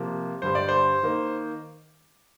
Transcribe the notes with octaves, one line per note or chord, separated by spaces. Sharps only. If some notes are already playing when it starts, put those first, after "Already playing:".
Already playing: C3 F3 A#3
G2 D3 G3 C5
D5
C5
D#3 A#3